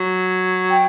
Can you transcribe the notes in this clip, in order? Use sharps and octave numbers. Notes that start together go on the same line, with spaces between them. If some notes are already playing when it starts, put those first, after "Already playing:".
Already playing: F#3
G5